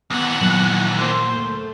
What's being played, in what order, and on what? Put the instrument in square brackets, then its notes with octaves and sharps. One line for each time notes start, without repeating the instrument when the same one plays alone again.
[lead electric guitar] D#2 E3 [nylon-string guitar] B3 [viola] F#5
[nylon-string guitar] A#2 F#3 A5
[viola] A#3 C5
[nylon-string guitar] D2 [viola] A3